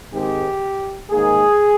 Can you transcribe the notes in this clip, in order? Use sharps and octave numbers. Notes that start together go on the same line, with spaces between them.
G#2 D#3 G#3 C4 G4
G#2 D#3 A#3 G#4